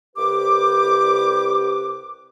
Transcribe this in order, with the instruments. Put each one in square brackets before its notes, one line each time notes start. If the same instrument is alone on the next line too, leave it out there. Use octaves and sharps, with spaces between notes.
[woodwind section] C2 G4 B4 D6